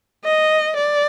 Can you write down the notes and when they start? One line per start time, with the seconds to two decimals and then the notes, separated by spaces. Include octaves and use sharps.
0.24 D#5
0.77 D5